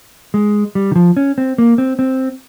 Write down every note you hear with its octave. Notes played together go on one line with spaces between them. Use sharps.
G#3
G3
D#3
F3
C#4
C4
A#3
C4
C4